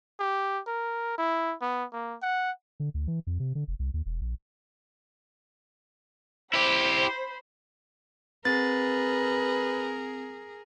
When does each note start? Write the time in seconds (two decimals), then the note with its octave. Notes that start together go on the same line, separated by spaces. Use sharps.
0.19 G4
0.67 A#4
1.18 E4
1.61 B3
1.92 A#3
2.22 F#5
2.80 D3
2.94 D2
3.08 E3
3.27 F2
3.40 C3
3.55 D3
3.68 F1
3.79 C2
3.94 D#2
4.06 E1
4.21 A#1
6.53 E4 G4 C5 B5
8.45 C4 G#4 A#4 B4 A6